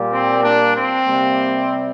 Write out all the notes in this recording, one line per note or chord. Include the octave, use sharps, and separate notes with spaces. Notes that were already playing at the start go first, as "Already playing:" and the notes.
Already playing: A#2 G3 A#3
C4
A#3 D4
C4
C3 G3 A#3